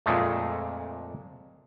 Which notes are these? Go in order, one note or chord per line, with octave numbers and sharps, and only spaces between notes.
F2 A#2 G#3 A3